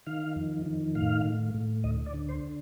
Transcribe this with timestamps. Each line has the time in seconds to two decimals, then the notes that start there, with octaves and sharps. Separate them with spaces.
0.06 D#3 F5
0.36 F2
0.66 D#3
0.95 A2 F5
1.25 A2
1.54 A2
1.84 D2 D#5
2.06 D5
2.14 D3
2.29 C5